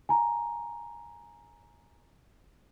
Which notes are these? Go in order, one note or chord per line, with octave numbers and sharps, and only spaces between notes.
G#5 A#5